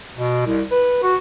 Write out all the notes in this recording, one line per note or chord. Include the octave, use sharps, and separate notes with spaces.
B2
C2
B4
F#4